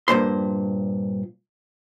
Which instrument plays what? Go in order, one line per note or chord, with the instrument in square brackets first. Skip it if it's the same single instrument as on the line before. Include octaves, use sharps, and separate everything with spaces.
[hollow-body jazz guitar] G2 A#2 C5 C6